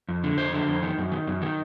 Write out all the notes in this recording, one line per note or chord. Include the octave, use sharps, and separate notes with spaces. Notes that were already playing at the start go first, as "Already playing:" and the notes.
F2
D3
F2 C5
D3
F2
D#3
F#2
D#3
F#2
D#3